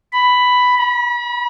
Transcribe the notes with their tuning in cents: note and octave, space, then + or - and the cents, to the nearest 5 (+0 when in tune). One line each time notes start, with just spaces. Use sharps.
B5 +5
B5 -40